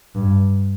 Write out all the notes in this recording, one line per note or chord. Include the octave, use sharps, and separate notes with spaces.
G2